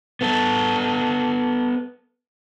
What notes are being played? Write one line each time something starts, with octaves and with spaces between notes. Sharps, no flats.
B3 A4